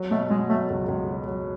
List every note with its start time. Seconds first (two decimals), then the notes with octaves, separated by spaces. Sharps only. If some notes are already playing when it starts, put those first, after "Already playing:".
Already playing: F#3
0.11 B2 A3
0.30 B2 G#3
0.49 F#3 A3
0.70 C#2
0.88 C#2
1.08 F#3
1.28 F#3